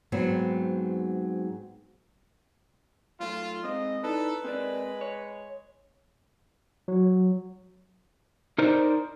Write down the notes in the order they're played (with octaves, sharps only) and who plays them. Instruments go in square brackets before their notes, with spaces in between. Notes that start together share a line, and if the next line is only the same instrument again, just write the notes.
[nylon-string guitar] G#2 F#3 B3 C4
[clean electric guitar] F#2 A3 [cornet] F4
[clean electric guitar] G#3 C4 [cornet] D#5
[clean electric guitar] D#4 E4 D5 [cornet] A4 [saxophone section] B4
[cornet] G#3 [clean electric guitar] C4 A#4 D5
[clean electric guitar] C#5
[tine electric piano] F#3
[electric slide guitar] D#4 A#4 C5 D5